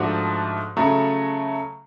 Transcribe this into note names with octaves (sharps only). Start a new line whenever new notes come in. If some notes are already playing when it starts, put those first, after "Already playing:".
Already playing: G#2 F3 A3 D4 F#4
C#3 F#3 A3